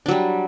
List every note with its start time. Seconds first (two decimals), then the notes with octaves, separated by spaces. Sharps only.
0.06 D4
0.08 F#3
0.11 G3